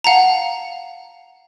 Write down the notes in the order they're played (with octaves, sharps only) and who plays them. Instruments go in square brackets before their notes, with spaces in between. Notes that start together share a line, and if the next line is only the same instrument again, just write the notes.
[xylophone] F5 F#5 A5 A#5